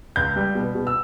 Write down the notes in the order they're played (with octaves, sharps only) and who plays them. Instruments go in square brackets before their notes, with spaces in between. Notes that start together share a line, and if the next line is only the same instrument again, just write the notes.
[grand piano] C#2 G6
G3
B2
B2
E6